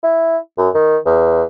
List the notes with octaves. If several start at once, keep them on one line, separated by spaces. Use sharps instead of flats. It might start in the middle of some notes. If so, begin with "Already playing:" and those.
E4
F#2
D#3
E2